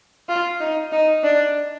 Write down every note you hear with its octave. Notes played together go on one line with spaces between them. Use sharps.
F4
D#4
D#4
D4